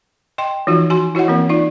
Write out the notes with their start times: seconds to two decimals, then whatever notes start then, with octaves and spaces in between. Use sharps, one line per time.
0.38 D#5 G5 C6
0.67 E3 F3 D#4 F4 F#4
0.90 F#4 G#5 C6
1.15 E4 F#4 C#5 D#5 F#5
1.28 E3 A#3 C4 A#4
1.49 D#4 F4 D5